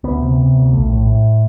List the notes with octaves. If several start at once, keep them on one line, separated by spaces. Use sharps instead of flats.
D2 B3
C3
C3
D2
A#1 A3
A2
A2